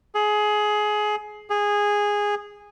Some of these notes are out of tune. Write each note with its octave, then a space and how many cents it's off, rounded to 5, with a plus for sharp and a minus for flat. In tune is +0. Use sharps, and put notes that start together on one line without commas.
G#4 +20
G#4 -10